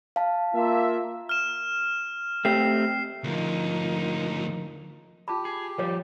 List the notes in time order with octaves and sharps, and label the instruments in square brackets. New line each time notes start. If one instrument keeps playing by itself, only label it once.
[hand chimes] F5 A5
[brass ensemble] A#3 F4 E5
[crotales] F6 E7
[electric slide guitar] A3 C4 G4 [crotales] C7
[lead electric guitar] D2 F3 [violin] A#3 D#4
[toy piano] F4 A5 B5 [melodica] G4
[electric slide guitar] G#4
[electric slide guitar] F3 G3 [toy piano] B4 C#5